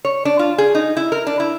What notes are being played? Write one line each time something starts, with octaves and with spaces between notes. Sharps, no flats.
C#5
D4
F4
G#4
D#4
E4
A#4
D4
E4